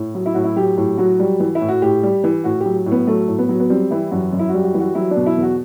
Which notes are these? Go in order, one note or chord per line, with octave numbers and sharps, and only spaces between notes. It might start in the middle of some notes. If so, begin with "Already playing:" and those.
Already playing: A2
F#3
E4
A2 F#4
E4
F#3 G4
A2 G4
F#3 F#4
G3
E3
E4
A2
F#4
A2 G4
G3
E3
A2 F#4
G4
F#3
A2
B3
F#3 A3
A2
B3
F#3
B3
G3 C4
E3 E4
F#2 F#4
F#2
E4
F#4
G3
F#4
E3
F#4
F#3 E4
D4
B2
E4
E2
F#4